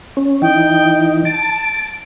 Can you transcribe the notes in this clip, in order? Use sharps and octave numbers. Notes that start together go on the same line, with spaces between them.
C#4
E3 D#4 G5
A5 D7